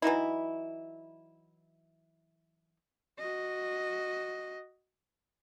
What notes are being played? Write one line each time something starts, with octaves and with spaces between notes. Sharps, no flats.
E3 F#3 D#4 E4
F#4 D#5